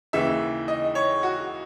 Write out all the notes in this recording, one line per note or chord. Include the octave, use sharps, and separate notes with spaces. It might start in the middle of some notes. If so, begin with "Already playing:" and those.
D#2 C#3 E3 E5
D#5
C#5
F#4